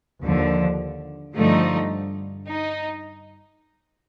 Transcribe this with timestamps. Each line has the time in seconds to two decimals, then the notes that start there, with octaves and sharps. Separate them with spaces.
0.22 D#2 D3 F3
1.34 G2 D3 F3 A3 D#4
2.47 D#4